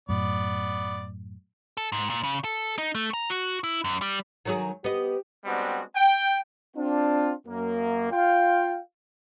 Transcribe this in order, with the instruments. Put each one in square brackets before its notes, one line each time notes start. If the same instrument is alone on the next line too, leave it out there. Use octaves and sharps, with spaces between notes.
[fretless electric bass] F#2 A2 [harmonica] B3 D5
[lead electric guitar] A4
G#2
A#2
C#3
A4
D#4
A3
A#5
F#4
E4
F#2
G3
[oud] D#3 F#3 G#4
[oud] B3 D#5 [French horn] G4
[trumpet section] G3 G#3 B3 C4 D4 F#4
G5
[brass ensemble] C4 D4 F4
F#2 A#3
F4 F5 G5